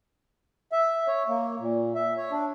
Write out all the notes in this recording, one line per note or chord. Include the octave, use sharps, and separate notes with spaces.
E5
C#5
A#3
A#2
E5
C#5
D4